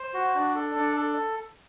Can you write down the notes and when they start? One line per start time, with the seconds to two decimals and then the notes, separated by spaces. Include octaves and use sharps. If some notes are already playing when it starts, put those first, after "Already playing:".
Already playing: C5
0.14 F#4
0.35 D4
0.55 A4
0.75 D4
0.97 A4